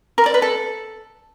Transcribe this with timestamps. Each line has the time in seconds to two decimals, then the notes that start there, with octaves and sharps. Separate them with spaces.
0.18 A#4
0.26 D5
0.34 B4
0.42 A4